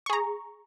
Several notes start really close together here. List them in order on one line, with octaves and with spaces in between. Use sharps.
C#6 G#4 A#5